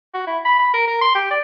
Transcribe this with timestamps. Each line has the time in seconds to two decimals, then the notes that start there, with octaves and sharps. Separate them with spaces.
0.14 F#4
0.27 E4
0.45 B5
0.59 B5
0.74 A#4
0.88 A#4
1.01 C6
1.15 G4
1.31 D5